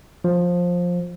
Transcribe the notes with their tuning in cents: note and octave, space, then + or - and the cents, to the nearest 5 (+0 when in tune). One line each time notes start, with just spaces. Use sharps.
F3 +15